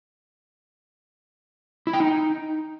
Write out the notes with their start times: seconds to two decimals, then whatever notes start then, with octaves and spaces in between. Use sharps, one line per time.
1.87 E4
1.93 G5
2.00 D#4